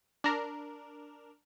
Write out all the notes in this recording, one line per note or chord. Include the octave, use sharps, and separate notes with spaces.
D4 A#4